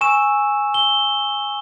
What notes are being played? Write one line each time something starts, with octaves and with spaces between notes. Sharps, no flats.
G#5 C#6 E6 E7
G7